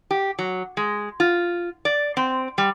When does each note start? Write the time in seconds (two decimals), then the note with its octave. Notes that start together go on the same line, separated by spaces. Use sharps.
0.11 G4
0.39 F#3
0.77 G#3
1.20 F4
1.85 D5
2.17 C4
2.58 G3